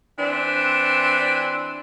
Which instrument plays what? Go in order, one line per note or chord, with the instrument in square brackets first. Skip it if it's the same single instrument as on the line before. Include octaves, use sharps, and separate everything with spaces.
[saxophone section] E3 C4 D4